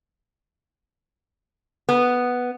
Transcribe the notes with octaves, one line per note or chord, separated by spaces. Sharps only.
B3